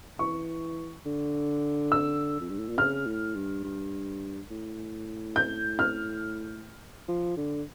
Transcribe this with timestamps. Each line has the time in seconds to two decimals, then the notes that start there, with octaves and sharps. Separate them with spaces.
0.19 E3 C#6
1.06 D3
1.92 E6
2.40 F2
2.49 G2
2.58 A2
2.69 A#2
2.77 C#3 F6
3.07 A2
3.35 G2
3.64 G2
4.50 A2
5.36 G6
5.79 F6
7.08 F3
7.37 D3